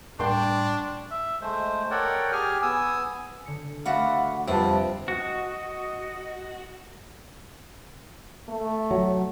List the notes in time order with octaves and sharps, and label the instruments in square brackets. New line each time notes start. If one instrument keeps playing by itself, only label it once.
[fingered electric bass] A2 G3 [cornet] D4 [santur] G5 C6 C#6
[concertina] E5
G#3 A3 C5
A4 A#4 C#5 D5 F#5 G5
G4 G#4 G#5 F6
B3 G#5 D#6 E6
[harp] D3 C#7
[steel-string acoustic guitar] A3 F#4 F#5 [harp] D5 B5 C6 [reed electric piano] F5
[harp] F2 F4 [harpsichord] C3 [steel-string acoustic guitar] F3 [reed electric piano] G3 B4 A5
[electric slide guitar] F#4 [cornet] D#5
[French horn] A3
[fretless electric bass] F#3